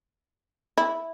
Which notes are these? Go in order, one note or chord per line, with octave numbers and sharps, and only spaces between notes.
E4